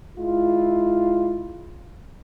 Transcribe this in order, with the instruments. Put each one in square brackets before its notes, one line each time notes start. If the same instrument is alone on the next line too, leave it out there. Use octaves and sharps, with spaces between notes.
[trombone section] G#3 E4 F4